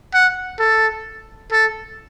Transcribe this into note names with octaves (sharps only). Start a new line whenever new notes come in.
F#5
A4
A4